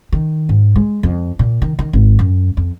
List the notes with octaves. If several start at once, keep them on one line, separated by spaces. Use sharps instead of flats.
D#3
G#2
G#3
F2
A#2
D#3
D#3
G#1
F#2
F2